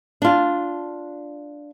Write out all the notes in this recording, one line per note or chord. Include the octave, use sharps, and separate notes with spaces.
D4 F4